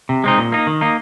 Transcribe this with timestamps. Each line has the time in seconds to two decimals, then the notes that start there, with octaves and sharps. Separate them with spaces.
0.09 C3
0.24 G#3 C4 D#4
0.38 A#2
0.52 A#3 D#4
0.67 D#3
0.81 A#3 D#4